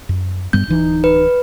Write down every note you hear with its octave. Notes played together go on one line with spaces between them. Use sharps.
F#2
G2 G3 B3 G6
D1 E3 D#4
B4